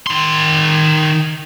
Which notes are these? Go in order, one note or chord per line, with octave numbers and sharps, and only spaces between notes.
D#3 C6